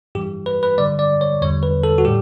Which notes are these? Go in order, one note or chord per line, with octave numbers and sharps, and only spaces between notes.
G2 E3 G3 G4
B4
B4
G2 D3 G3 D5
D5
C#5
E2 D3 G3 C#5
B4
A4
F#4
A2 G3 G4